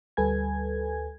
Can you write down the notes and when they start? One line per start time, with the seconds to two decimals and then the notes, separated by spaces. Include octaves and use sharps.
0.17 D2 G3 A4 B4 G#5 G#6